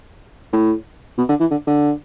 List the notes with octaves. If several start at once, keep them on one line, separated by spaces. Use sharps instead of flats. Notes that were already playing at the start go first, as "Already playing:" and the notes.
A2
B2
D3
E3
D3
D3